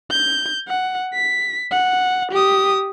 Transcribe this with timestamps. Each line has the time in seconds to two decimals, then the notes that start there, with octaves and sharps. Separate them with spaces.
0.11 G6
0.68 F#5
1.14 B6
1.72 F#5
2.32 G4 D#6